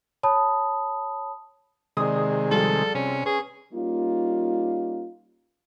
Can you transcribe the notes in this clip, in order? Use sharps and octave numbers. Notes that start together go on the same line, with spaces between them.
C#5 A5 B5 D#6
C3 D#3 G#3 G#4 D5 D#6
F2 G3 A4
C3 C#4
C#4 G#4 B4
G3 A#3 C#4 D#4 F4